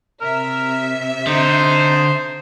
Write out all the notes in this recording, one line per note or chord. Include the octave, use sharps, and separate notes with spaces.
C3 A#4 E5
D3 D#4 C5